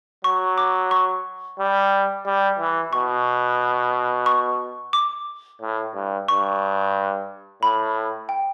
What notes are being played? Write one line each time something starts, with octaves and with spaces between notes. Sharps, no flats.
F#3 C#6
D6
C#6
G3
G3
E3
B2 C#6
C#6
D6
A2
G2
G2 C#6
A2 B5
G5